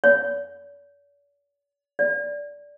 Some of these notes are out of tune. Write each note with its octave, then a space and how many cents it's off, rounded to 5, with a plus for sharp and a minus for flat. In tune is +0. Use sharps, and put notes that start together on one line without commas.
D5 -45
D5 -10